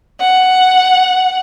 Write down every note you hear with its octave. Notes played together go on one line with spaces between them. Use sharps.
F#5